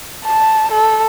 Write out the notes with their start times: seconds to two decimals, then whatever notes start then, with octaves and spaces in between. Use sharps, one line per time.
0.25 A5
0.72 A4